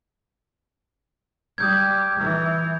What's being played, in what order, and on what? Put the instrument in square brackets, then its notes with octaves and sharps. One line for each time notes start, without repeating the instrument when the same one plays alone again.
[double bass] G3 [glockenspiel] D#6 G6 G#6
[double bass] E3